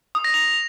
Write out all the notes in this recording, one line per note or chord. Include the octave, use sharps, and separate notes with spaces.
D#6
A#6
F7